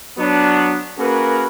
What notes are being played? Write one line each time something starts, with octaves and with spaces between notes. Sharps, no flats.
F#3 B3 D4
A#3 C#4 F#4 G#4 A#4 B4